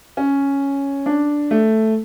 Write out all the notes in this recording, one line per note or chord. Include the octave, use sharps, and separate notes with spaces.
C#4
D4
A3